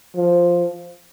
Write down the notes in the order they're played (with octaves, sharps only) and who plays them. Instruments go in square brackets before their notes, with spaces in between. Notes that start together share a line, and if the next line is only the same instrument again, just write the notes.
[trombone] F3